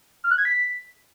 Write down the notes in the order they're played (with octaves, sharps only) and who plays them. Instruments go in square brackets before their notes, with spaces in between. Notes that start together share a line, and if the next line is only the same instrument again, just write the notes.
[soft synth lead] F6
F#6
G#6
B6